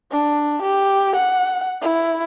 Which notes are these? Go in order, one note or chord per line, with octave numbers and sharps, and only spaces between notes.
D4
G4
F#5
E4